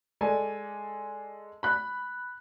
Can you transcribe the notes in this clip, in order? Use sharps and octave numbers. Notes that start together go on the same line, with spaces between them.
G#3 A4 D5 G#5
B5 F#6